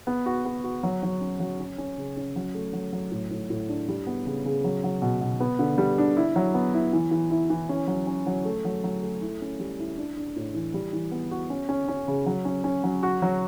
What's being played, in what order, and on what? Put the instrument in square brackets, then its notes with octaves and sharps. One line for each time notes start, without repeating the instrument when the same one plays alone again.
[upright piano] B3
F#4
B3
F#4
F#3
F#3
C#4
F#3
C#4
C#4
C#3
C#4
F#3
A3
F#3
F#3
A2
A2
A2
D4
G3
B3
C#3
C#3
F#3
F#3
B2
B2
B3
D3
G3
D4
E4
F#3
B3
E4
E3
E3
E4
E3
C#4
F#3
C#4
F#3
A3
F#3
F#3
A3
E4
C#4
G3
E4
D4
D4
A2
E3
G3
E3
B3
F#4
C#4
C#4
C#4
C#3
F#3
C#4
C#4
F#3
F#4
F#3